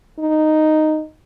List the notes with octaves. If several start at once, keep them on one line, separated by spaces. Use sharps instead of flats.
D#4